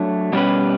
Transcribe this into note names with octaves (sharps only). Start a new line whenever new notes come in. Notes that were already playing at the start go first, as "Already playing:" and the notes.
Already playing: F#3 A3 D4 F#4 C#5
B2 G3 C#4 G4 B4